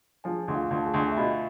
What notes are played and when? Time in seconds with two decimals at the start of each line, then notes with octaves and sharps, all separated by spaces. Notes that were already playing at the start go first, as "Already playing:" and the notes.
0.24 F3 G#4 G#5
0.48 D2
0.55 F4 F5
0.70 D2
0.78 A5
0.86 G#4 G#5
0.94 D2
1.12 E5
1.17 B2 F4 F5